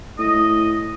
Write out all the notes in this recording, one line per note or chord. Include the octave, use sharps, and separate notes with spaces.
A2 D#5